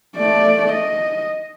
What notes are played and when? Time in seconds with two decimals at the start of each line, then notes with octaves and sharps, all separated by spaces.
0.17 A3 D5
0.72 D#5